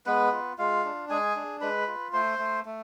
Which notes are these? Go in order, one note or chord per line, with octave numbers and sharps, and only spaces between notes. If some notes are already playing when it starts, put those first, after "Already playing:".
G#3 B3 B4
F4
G#3 F4 F5
D4
G#3 G#4 G#5
D4
G#3 B4 B5
F4
A3 C5 C6
A3
A3